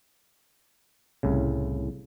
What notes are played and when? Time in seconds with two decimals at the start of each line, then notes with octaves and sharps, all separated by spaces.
1.23 C2 A2 C#3